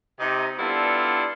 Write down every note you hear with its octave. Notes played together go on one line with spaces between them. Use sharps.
C3 D#4
G3 B3 D4 E4 F4 A4